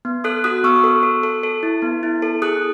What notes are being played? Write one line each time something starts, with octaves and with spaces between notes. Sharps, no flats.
B3
A4 D#6 F#6
F#4 D#6 F#6
B3 C#6 E6
A4
A4
A4
A4
E4
B3
E4
A4
G#4 D#6 F#6